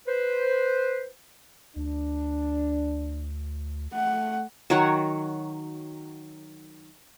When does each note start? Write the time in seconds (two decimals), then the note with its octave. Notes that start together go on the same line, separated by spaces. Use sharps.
0.07 B4 C5
1.76 D2 D4
3.93 A3 F#5
4.70 D#3 F#3 C#5 F#5